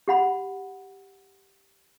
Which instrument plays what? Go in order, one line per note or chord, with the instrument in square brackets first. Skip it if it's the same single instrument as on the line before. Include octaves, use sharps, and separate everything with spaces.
[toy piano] G4 F#5 B5